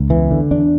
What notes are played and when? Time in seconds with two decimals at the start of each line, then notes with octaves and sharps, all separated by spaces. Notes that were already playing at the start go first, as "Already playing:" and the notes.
Already playing: C#2
0.10 E2 E3
0.31 D3
0.51 E2 D4